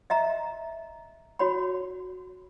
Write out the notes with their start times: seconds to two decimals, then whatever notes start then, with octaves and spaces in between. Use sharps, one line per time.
0.10 D#5 E5 A#5
1.39 F#4 C#5 B5